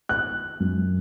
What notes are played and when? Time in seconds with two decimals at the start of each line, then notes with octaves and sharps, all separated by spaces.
0.09 F#6
0.60 F#2